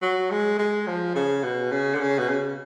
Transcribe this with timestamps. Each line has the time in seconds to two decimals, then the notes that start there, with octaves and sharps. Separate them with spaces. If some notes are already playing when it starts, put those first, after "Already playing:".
0.02 F#3
0.31 G#3
0.59 G#3
0.87 F3
1.15 C#3
1.44 B2
1.72 C#3
1.95 D3
2.00 C#3
2.19 B2
2.29 C#3